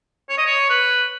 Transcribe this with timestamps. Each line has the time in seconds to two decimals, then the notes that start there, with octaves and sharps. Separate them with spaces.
0.29 C#5
0.38 D#5
0.46 C#5
0.70 B4